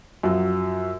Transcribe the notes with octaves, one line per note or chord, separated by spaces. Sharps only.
F#2 F3 F#3